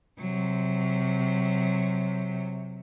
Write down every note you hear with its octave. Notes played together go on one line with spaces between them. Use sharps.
C3 F#3